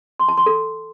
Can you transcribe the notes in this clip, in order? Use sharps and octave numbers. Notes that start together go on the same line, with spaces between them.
C6
A5
C6
A4